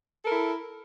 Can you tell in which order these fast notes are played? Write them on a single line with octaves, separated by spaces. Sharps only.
A4 A#4 E4